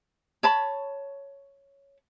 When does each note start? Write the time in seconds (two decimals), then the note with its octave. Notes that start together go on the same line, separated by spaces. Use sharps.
0.43 C#5 A5 B5